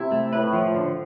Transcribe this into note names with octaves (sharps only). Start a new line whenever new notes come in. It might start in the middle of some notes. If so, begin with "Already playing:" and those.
Already playing: C3 E4
A3
A2 B4
F3
D3